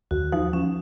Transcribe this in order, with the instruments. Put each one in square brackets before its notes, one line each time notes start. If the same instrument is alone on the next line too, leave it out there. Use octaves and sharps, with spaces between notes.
[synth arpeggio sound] D#2 [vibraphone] F#4
[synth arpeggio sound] F3 [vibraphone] D#4
[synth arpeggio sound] F3 [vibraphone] C#4